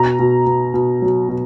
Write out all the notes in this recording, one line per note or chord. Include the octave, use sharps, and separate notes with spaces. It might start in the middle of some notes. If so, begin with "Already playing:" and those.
Already playing: B2 A#5
B2
B2
B2
F#3
B2